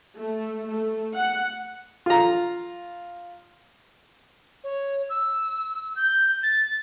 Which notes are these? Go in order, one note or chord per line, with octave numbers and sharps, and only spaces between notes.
A3
A3
F#5
F4 A#5
C#5
E6
G6
A6